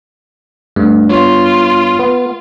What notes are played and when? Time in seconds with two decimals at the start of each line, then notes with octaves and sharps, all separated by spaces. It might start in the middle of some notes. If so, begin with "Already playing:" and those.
0.76 G2 A3
1.10 B3 F4 C#5
1.99 B3